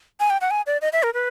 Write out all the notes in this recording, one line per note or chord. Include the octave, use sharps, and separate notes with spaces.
G#5
G5
F#5
G#5
D5
D#5
E5
A#4
B4